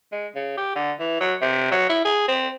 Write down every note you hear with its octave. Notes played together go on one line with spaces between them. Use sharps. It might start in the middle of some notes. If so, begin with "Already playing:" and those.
G#3
C#3
G4
D3
E3
F#3
C3
F#3
E4
G#4
C4